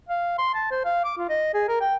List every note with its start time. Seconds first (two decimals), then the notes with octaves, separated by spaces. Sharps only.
0.09 F5
0.38 C6
0.55 A5
0.71 C5
0.85 F5
1.04 D6
1.18 F4
1.30 D#5
1.54 G#4
1.68 A#4
1.81 G5